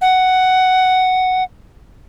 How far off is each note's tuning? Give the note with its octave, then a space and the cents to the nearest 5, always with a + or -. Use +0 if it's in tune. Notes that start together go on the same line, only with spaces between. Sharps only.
F#5 +5